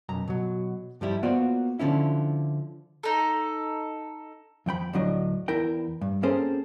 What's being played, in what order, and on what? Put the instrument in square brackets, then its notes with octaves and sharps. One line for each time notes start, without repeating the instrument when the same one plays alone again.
[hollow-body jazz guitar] B1 F#2 A#5
B2 F#3
G2 F3 G3 E4
A#3 B3 F4 F#4 C5 D5
D3 F3 C#4 E4
[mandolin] D#4 A4
[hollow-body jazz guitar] F2 F3 G5 B5
D2 A2 F#3 D4 D#5
E2 E4 A#4 G5
G2
A#3 C4 C#4 G#4 A4 C5